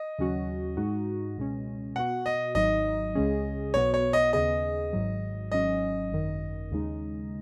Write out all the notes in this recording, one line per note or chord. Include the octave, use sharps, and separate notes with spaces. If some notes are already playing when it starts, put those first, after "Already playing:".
Already playing: D#5
D#2 C#3 F#3 C#4 F#4
G#2 G#3 D#4 F#4
C#2 B2 G#3 C#4
B2 B3 F#4 F#5
D#5
G#1 G#2 F#3 D#4 D#5
C#2 C#3 G#3 C#4 G#4
B1 B2 B3 F#4 C#5
C#5
D#5
D#2 C#3 B3 G#4 D#5
G#1 G#2 F#3
G#1 G#2 F#3 C#4 D#5
G#1 F#2 D#3
D#2 C#3 G#3 D#4